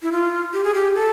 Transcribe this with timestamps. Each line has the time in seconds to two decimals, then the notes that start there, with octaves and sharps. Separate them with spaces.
0.03 E4
0.12 F4
0.53 G4
0.64 G#4
0.74 G4
0.95 A4